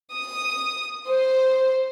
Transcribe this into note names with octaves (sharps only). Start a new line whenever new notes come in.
D#6
C5